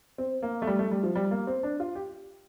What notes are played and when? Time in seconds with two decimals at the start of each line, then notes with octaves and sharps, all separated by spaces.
0.18 C4
0.43 A#3
0.62 A3
0.67 G3
0.79 A3
0.91 G3
1.03 F3
1.15 G3
1.31 A#3
1.47 C4
1.63 D4
1.80 F4
1.95 G4